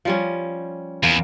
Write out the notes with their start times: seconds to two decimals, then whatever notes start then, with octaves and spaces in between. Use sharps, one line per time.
0.05 F3 G3 C#4
1.03 E2 A#3